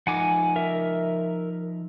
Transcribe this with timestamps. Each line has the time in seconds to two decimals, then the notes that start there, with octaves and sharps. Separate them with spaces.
0.07 F3 D#4 F#5 G#5 D6
0.56 A#4 E5